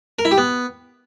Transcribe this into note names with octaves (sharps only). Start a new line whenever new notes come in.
A#4
E4
G4
B3